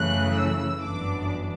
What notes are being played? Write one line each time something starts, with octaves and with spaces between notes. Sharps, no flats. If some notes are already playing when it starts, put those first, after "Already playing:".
Already playing: F#2 C#3 E3 A3 F#6
E6
G1 F#2 E3 B3 D4 D6